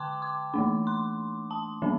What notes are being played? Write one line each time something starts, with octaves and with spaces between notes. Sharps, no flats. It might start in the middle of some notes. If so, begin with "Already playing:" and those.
Already playing: D3 G5 A5 C6 D6
D6
E3 A3 D4
C6
A5
E3 G3 B3 D4